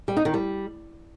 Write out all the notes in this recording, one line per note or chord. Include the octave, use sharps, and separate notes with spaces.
G3
D#4
D#3
G3